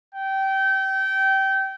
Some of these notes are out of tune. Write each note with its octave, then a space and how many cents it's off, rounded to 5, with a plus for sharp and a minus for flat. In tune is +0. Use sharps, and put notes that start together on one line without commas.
G5 -25